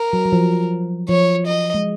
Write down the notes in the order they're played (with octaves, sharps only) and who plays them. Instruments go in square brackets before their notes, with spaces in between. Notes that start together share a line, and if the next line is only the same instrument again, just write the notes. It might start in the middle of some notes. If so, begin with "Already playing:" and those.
Already playing: [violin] A#4
[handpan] F#3
F#3
F3
[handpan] F3 [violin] C#5
[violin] D#5
[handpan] G#3